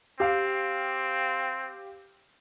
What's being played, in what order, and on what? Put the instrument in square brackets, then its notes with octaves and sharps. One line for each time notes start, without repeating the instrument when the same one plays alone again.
[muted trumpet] C4 [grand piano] G4 F5